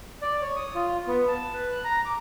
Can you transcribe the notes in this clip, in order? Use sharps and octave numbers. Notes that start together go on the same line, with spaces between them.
D5
C#5
D#6
F4
B3
A5
B4
F#6
A#5
D6